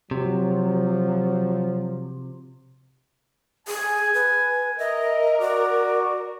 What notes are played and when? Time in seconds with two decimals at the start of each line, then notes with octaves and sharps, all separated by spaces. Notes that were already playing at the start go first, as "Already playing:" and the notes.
0.11 C3 F3 F#3
3.67 G#4 G#5
4.14 B4
4.79 A#4 D#5 E5
5.40 F#4 D5 D6